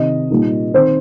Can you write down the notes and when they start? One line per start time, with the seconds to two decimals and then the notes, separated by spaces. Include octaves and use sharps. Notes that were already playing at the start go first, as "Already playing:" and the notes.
Already playing: C3 D#3 C4 D#4 D#5
0.30 A#2 G3 A#3 D#4
0.74 D#3 C4 D#4 C5